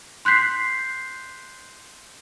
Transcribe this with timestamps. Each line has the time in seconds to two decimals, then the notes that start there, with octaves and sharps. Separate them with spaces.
0.25 C6 F#6 G6 B6 C7